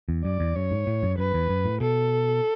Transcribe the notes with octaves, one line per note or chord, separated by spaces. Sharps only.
E2
F#2 D5
E2
F#2 C#5
G#2
A2
F#2
F#2 B4
E2
F#2
A2
B2 A4